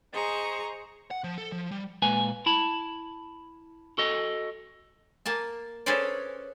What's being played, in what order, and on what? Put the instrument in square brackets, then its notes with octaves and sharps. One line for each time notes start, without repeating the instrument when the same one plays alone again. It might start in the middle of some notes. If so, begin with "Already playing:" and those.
[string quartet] G#4 C5 D#5 A#5 C#6
[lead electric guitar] F#5
F3
A4
F3
G3
[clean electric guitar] A#2 G#3 B4 G#5
E4 A5 B5
F#4 A4 D#5
[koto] A#3 G#5 A5
C#4 G#4 A4 B4 C5 D5